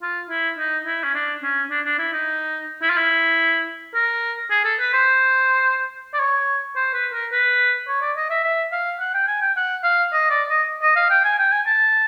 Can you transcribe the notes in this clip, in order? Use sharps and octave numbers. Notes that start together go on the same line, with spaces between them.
F4
E4
D#4
E4
C#4
D4
C#4
D4
D4
E4
D#4
E4
F4
E4
A#4
G#4
A4
B4
C5
D5
C#5
C5
B4
A#4
B4
C#5
D5
D#5
E5
E5
F5
F#5
G5
G#5
G5
F#5
F5
D#5
D5
D#5
D#5
F5
G5
G#5
G5
G#5
A5